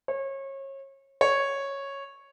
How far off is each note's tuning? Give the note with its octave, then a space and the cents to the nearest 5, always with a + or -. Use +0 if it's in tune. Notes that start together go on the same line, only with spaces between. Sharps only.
C#5 -30
C#5 -5